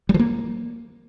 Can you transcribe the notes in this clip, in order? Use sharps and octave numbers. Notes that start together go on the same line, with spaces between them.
G3
F3
A#3